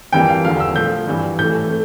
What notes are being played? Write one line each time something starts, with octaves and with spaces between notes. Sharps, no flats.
F2 E3 G3 A#3 G5
F5
E2 D3 F3 F5
E6
A#2 F3 A3 G6
G2 E3 G3
A2 E3 A3 G6
A3